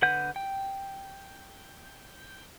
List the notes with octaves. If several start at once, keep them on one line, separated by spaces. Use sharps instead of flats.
D3 B4 F#5 G6
G5